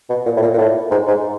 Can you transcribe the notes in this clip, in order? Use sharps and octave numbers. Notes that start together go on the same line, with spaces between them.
B2
A#2
A2
A#2
A#2
A2
G#2
G#2